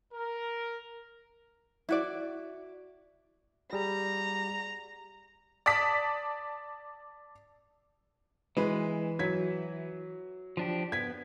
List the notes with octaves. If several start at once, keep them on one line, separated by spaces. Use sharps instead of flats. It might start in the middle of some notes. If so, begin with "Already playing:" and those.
A#4
E4 F#4 D5
G3 G#4 A#5
D5 A5 D#6 B6
E3 G#3 B4
F#3 G#6 B6
F3 D4 G4
B3 G#6 B6